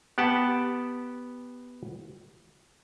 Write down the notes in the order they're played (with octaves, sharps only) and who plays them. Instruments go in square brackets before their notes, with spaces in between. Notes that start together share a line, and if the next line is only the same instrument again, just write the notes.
[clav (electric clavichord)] B3 G4 F#5 G5 A5